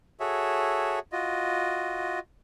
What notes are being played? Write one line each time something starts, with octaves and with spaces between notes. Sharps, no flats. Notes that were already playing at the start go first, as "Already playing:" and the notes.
F#4 G#4 A4 C#5 E5
F4 F#4 D#5